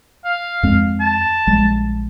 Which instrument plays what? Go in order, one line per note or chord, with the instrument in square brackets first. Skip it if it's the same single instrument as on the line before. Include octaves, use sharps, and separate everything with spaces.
[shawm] F5
[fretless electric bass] F2 G#3 C4
[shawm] A5
[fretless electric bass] A#1 G3 G#3